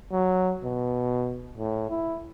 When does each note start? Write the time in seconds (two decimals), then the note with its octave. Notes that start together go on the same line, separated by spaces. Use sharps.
0.12 F#3
0.64 B2
1.58 A2
1.90 E4